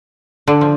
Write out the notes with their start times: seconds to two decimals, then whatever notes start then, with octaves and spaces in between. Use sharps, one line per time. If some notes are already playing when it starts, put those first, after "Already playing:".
0.48 D3
0.61 F3